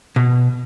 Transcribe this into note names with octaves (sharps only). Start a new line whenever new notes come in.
B2